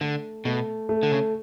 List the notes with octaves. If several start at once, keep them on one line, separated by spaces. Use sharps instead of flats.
D3 A3
B2 A3
A3
D3
C#3